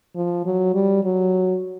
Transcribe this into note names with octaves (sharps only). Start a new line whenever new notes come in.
F3
F#3
G3
F#3